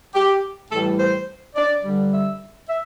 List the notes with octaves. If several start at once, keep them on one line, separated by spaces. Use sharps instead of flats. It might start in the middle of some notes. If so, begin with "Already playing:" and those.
G4
A2 E3 G3 A4
C5
D5
G2 D3 G3
E5
E5